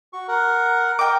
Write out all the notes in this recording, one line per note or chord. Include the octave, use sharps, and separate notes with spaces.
F#4 C#6
A#4 F#5
A#4 D#5 G5 D6